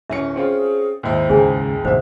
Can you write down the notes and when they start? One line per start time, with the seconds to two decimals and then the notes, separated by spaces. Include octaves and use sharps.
0.10 D1 C#4 E5 C#7
0.36 C4 C#4 F4 G#4
1.03 D#2 G#2 E4 C5
1.30 C#2 G#4 G#5
1.85 D2 G#2 B2 D#3 F3 C5 E5